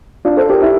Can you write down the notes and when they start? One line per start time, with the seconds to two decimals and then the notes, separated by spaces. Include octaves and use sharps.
0.25 D4 F4
0.37 A4 C5
0.50 G4 A#4
0.62 E4 G4